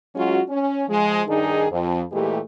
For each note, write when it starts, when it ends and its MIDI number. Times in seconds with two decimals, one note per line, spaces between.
0.16 0.41 54
0.16 0.41 56
0.16 0.41 61
0.16 0.41 65
0.16 0.41 66
0.49 0.83 61
0.89 1.21 53
0.89 1.21 56
1.27 1.66 43
1.27 1.66 51
1.27 1.66 62
1.27 1.66 63
1.27 1.66 68
1.70 2.02 41
2.12 2.39 46
2.12 2.39 52
2.12 2.39 56
2.12 2.39 57
2.12 2.39 67